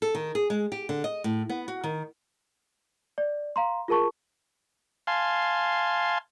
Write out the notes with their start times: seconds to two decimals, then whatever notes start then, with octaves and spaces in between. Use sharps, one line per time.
0.02 A4
0.15 D#3
0.35 G#4
0.50 G#3
0.72 G4
0.89 D3
1.04 D#5
1.24 A2
1.49 B3
1.68 F#4
1.84 D#3
3.18 D5
3.56 F5 A#5 C6
3.88 F4 G#4 A#4 A5 C#6
5.07 F5 G#5 A5 C6